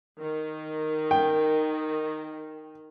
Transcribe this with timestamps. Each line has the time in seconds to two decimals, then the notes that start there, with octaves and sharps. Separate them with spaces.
0.19 D#3
1.11 G5